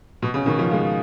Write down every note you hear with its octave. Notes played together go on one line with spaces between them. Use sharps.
B2
C#3
B2 D#3
C#3 F3
F3 G#3